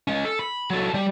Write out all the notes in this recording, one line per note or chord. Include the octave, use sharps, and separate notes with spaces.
G#3 C#4
A4
B5
F#3 A4
G3